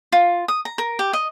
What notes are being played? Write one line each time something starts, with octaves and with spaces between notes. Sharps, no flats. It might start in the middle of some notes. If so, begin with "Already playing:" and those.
F4
D#6
A#5
A#4
G4
D#5